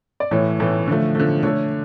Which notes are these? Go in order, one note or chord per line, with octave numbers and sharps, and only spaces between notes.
D5
A2 E3 A3 C#5
A2 E3 A3
D3 F3 A3
D3 F3 A3
D3 A3 C#5